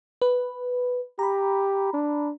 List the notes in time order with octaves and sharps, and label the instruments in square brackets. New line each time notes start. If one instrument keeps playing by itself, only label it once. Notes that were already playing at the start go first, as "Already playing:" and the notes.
[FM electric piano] B4
[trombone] G4 [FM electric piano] A#5 B5
[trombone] D4